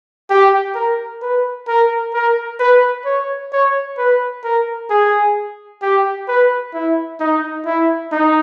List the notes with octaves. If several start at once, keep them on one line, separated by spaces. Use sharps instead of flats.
G4
A#4
B4
A#4
A#4
B4
C#5
C#5
B4
A#4
G#4
G4
B4
E4
D#4
E4
D#4